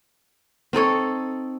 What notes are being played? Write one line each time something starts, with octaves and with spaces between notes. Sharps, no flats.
C4 D#4 A4 C#5